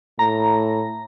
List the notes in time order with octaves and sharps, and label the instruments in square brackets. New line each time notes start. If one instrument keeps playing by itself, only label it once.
[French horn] A2 [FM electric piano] A#5